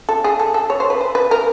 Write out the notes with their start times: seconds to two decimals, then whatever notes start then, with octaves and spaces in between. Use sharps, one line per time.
0.09 A4
0.24 G#4
0.40 A4
0.54 A4
0.70 C#5
0.80 C5
0.90 B4
1.01 C5
1.15 B4
1.31 A#4